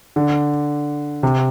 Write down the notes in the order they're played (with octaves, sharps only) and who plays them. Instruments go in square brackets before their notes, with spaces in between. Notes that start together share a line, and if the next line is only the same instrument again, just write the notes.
[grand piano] D3
C3